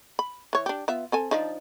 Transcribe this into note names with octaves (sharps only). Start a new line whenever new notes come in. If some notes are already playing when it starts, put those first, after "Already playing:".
B5
E3 C#5
D4 G4
B3 F4 E5
C4 A4 G#5
F3 D4 D#4